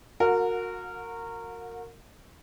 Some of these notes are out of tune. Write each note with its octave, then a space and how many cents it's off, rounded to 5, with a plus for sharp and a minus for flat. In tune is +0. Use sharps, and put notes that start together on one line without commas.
F#4 -25 A#4 -20 F#5 -45